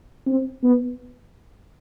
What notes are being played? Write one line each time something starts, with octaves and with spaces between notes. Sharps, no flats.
C4
B3